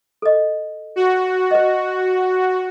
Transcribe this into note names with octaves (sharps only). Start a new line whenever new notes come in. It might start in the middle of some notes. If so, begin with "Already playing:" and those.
A4 D#5
F#4
B4 D#5